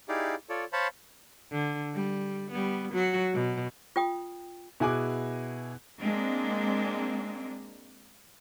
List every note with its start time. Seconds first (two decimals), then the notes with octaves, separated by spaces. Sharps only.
0.09 D#4 E4 G4 G#4 D5 F5
0.49 F4 A4 C#5 D5
0.73 C5 C#5 F5 A5 B5
1.52 D3
1.94 G3
2.51 G3 B3
2.93 F#3 F#4
3.34 B2
3.96 F4 G5 D#6
4.80 B2 E4 G#4 G#5 D6 F#6
5.99 G#3 A#3 C4 D4